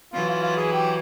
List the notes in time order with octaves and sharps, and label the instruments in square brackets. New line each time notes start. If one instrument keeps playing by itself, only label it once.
[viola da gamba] E3 F#3 [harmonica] F4
[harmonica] F4
F4
G#4
G4